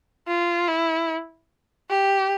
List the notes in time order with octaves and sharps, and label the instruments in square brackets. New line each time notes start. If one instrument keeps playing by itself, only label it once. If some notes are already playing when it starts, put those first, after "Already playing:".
[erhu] F4
E4
G4